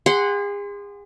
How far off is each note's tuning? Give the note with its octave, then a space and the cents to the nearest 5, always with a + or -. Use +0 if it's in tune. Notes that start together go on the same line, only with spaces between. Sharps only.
G#4 -40 F#5 +0 C6 -10